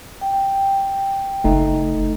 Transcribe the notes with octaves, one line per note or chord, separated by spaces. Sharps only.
G5
F#1 A3 D#4